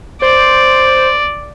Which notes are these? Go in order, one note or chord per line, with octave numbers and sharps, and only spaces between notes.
C5 D5